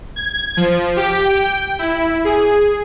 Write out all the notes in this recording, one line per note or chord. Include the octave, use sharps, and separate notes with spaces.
G#6
F3
G4
G5
E4
G#4